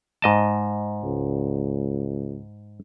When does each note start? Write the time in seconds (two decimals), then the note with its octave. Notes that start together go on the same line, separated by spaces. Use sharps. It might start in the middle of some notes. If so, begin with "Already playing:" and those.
0.22 G#2 D#5 A5
1.03 C#2